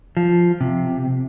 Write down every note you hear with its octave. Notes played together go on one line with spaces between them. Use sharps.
F3
C3